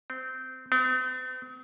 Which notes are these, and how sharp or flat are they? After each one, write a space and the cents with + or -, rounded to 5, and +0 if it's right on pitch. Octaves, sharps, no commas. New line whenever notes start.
C4 -20
C4 -45